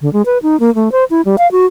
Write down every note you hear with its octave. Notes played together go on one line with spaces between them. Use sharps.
D3
G#3
B4
D#4
A#3
A3
C5
E4
G3
F5
F#4